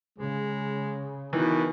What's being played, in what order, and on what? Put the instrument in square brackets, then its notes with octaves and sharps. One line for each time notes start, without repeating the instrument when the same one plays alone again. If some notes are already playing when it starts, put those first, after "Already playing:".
[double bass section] C#3 [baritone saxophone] G#3
[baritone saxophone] B2 [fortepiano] D#3 E3